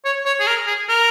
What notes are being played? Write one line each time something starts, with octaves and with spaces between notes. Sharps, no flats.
C#5
C#5
G#4
A#4
G#4
A#4